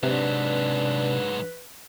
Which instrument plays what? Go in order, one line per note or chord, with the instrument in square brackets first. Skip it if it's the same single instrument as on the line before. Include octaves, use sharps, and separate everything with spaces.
[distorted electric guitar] G#2 F#3 [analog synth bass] C3 [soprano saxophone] D4 [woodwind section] B4